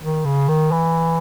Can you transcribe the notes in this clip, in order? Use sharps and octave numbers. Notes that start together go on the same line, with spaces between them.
D#3
C#3
D#3
E3